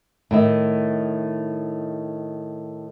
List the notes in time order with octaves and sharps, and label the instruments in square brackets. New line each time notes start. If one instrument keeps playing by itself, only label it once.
[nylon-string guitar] A2 D#3 A3